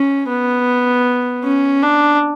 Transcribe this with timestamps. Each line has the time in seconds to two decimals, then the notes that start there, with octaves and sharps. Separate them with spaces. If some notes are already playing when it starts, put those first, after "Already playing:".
Already playing: C#4
0.29 B3
1.43 C#4
1.82 D4